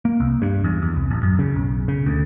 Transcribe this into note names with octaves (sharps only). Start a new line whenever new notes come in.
A#3
C2
G2
E2
E2
C2
A1
F#2
C#3
B1
C#3
D2